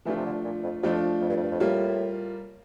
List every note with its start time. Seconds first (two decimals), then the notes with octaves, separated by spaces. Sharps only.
0.05 E3 F3 A3 D4 F4
0.16 C3
0.25 D3
0.44 A#2
0.63 F2
0.83 F2 F3 A3 D4 F4
1.21 F2
1.29 G2
1.36 F2
1.43 G2
1.51 F2
1.60 A2 G3 A#3 F4